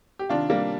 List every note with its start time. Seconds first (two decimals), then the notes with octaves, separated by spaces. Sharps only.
0.19 G4
0.29 C3 D#3 D4 F4
0.50 G3 A#3